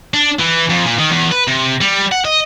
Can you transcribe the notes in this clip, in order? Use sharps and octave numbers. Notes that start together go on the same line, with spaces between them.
D4
E3
F2
A#2
D#3
E2
B4
C3
G3
F#5
D#5